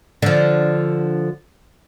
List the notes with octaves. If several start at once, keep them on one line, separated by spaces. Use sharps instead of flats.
D3 F3